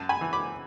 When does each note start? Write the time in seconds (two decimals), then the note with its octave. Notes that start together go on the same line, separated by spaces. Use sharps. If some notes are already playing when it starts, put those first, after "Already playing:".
Already playing: F#2 A5
0.09 G#5 B5
0.21 E3
0.33 B5 D6